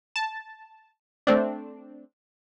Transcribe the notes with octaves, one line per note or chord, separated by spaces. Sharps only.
A5
A3 C4 D4